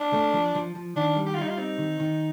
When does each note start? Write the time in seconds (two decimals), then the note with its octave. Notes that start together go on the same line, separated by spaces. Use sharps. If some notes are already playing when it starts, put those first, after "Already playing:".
Already playing: D4
0.13 A3
0.34 F3
0.55 F3
0.75 F3
0.96 D#3 D4
1.16 G3
1.26 G4
1.35 F4
1.38 G3 D#4
1.48 F4
1.58 C4 D#4
1.78 D#3
2.00 D#3